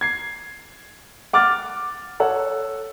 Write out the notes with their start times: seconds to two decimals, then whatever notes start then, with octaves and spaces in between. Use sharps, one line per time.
0.01 G#6 C7
1.33 F#5 D6 F6 A6
2.20 A4 C#5 F#5